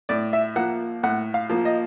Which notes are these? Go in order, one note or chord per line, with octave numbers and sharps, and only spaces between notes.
A2 D5
E5
F3 A#3 F#5
A2 F#5
F5
F3 A#3
D#5